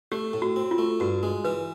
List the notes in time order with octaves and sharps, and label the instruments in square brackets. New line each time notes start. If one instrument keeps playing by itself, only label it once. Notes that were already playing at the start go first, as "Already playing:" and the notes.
[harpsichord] A3 [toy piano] G4
[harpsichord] A2
[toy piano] F#4
[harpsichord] C4
[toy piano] F4
[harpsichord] A3
[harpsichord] G2 [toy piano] F#4
[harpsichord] G#3
[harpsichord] E3 [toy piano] B4